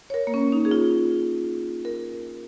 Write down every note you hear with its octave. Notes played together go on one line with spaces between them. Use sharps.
C#5
A#4
A#3
C#4
D#4
G#4
F4
A#4